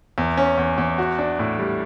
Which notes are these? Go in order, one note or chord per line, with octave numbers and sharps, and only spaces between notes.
E2
C#4
E2
E2
F#4
D4
A2
G3